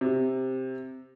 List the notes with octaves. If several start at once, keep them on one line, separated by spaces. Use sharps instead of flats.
C3